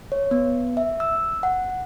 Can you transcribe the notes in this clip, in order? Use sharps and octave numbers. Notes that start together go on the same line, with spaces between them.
C#5
B3
E5
E6
F#5